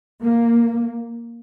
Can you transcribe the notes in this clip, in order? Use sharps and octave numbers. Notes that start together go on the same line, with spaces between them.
A#3